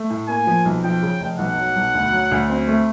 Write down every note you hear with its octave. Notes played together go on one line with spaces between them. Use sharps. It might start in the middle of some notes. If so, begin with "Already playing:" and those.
Already playing: A3
A2
A#3 G#5
F3
B1
F3 G5
C#3
F1
B1 F#5
F#3
B1
D2
F#3
D2
C4
A3